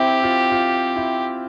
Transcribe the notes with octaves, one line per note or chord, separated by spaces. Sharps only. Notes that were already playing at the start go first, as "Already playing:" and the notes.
Already playing: C4 E4 G4
F4
F4
E4